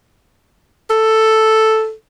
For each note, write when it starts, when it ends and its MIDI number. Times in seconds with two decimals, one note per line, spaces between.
0.90 1.93 69